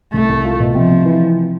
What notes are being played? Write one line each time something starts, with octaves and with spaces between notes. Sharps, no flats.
C2 A3
C2
F4
B2
C3 F3
C3
E3